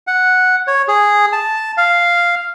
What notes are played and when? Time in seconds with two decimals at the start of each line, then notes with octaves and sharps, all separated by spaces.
0.07 F#5
0.67 C#5
0.88 G#4
1.32 A5
1.77 F5